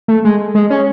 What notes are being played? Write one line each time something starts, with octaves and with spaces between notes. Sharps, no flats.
A3
G#3
G#3
C#4